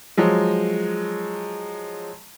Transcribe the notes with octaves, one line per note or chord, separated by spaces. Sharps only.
F3 F#3 G#3